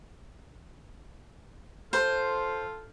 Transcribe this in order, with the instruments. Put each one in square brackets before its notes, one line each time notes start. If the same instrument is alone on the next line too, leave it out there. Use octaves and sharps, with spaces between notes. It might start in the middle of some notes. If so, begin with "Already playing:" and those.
[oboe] F4 [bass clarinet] A4 [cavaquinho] C5